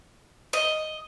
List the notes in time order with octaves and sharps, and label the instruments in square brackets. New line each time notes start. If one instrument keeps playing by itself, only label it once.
[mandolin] D#5